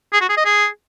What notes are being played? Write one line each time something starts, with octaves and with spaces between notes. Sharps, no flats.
G#4
F#4
G#4
D#5
G#4